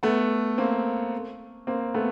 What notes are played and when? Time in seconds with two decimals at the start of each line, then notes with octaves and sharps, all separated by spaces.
0.03 A3 B3
0.58 A#3 C4
1.67 A#3 C4
1.94 A3 B3